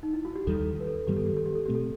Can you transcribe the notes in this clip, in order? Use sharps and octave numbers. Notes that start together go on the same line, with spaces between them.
D#4
E4
F#4
G4
D#2 D#3 G3 A4
B4
A4
G2 D#3 G3 B3 G4
A4
G4
A4
G4
A4
B2 A3 C4 G4
A4